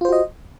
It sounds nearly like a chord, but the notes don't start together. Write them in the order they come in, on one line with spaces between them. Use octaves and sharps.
F4 C5 F#4 D#5